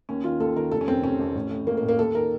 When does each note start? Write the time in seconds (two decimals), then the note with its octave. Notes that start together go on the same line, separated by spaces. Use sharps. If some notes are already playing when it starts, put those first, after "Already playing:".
0.09 D#2 C#4
0.24 D#3 F4
0.40 D#2 A4
0.56 D#3 A#4
0.71 F1 A4
0.81 C#4
0.87 F2 D#3 C4
1.03 F1 C#4
1.19 F2 D#3
1.35 A1
1.51 A2
1.67 A1 A#3
1.77 A#3
1.82 A2
1.89 A#3
1.99 D#2 A4
2.14 D#3 A#4